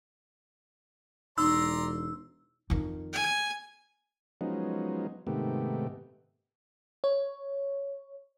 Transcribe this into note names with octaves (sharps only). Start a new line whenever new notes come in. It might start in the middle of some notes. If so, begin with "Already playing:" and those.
E1 D#4 D5 A#5 C6 E6
F2 D#3
G#5
F3 F#3 G#3 B3 C#4 D#4
G#2 C3 D#3 A3 B3 G4
C#5